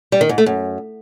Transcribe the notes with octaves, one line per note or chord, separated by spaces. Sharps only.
G3
D#3
G#2
A3
F#2